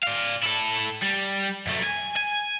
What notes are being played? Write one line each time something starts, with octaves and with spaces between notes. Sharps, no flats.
D5 F5
E4 A4
G3
F#2 A3
G#5
G#5